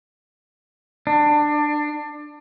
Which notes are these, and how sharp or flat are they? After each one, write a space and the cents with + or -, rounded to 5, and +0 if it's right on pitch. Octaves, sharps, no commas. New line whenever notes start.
D4 +20